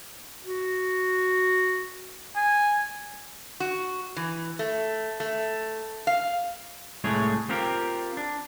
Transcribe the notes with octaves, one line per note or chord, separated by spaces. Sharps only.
F#4
G#5
F#4
E3
A3
A3
F5
C2 A2 G#3 A3 G#4 C#5
C4 F4 G4 A#4
D4